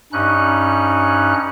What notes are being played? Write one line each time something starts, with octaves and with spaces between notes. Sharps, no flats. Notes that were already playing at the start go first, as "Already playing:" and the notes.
G2 C#4 D#4 F#6